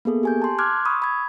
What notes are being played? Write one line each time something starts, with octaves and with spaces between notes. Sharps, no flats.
A#3 B3 G#4 A4
G4 G#5 G6
A5 C6
C6 D6 F6 F#6 G#6
B5 C#6 D#6 E6
B5 G#6